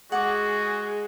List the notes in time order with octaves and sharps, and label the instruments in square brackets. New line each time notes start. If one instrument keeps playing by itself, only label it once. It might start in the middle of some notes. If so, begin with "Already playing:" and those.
[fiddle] G#3 [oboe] F#4 [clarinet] G#4 [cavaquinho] F#5 D6